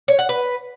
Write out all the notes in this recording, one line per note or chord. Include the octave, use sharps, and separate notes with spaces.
C#5
F#5
B4